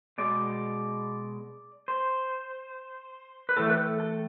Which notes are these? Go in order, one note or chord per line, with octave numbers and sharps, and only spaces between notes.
B2 G#3 D5
C5
B4
A2 E3 A3 A4
B4
A4
A4